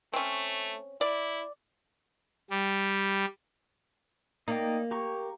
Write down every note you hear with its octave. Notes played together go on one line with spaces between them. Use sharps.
A3 C4 C#4
E4 D5
G3
A#3 D#4 D5 G5
G4 A#5 C#6